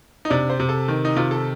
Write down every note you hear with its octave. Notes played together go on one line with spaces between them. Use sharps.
D#4
C3 D4
C5
C3
A4
D#3
D#4
C3 F4
A4